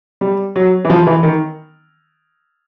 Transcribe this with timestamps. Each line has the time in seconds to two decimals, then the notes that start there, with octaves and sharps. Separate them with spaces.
0.21 G3
0.56 F#3
0.85 E3
0.90 F3
1.07 E3
1.23 D#3